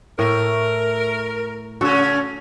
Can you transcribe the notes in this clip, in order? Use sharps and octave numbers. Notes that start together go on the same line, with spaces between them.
A2 A3 A#4
C#3 C#4 F#4 A4